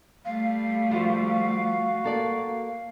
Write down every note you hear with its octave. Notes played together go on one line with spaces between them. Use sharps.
G3 A3 F5
F3 F4 F#4 C5
A#3 A4 D5